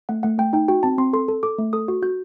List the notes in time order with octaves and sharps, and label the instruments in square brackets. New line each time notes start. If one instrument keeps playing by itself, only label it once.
[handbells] A3 F#5
A3 F#5
A3 G5
D#4 G5
F#4 G5
C4 A5
C4 C6
A4 C6
A4
A4 D6
A3
A4 D#6
F#4
F#4 G6